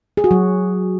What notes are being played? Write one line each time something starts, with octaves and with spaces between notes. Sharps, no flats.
G#4
F#4
F#3